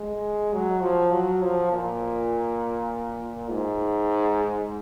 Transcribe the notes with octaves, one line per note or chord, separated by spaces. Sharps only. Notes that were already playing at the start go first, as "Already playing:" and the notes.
Already playing: G#3
F#3
F3
F#3
F3
A#2
G#2